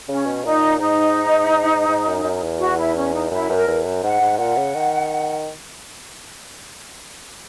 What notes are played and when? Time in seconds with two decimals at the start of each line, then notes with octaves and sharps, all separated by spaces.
0.08 C#3 C#4
0.26 B2
0.45 A#2 D#4
0.80 G#2 D#4
1.88 G#2
2.07 F#2
2.24 F#2
2.42 E2
2.59 F#4
2.77 E4
2.96 C#4
3.13 D#4
3.31 F#2 E4
3.50 F#2 B4
3.56 A#4
3.68 E2
3.85 F#2
4.04 G#2 F#5
4.21 G#2
4.39 A#2 F#5
4.57 C#3
4.75 D#3